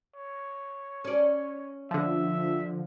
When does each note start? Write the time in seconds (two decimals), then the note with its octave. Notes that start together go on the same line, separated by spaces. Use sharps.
0.16 C#5
1.05 C#4 D5
1.91 D3 F3 E5